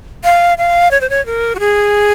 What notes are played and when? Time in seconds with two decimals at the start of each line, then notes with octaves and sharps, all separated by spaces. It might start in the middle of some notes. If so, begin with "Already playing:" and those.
0.24 F5
0.58 F5
0.91 C#5
1.01 C5
1.10 C#5
1.26 A#4
1.55 F#4
1.59 G#4